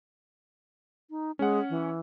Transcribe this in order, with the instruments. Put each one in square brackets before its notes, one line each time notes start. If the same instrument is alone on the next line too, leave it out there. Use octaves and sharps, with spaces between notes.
[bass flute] D#4
[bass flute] G#3 [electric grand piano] C#4 F#5
[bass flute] E3